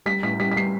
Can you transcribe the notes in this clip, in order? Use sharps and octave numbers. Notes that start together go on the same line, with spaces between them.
G3 B6
A2 B6
G3 B6
B6
G3 C7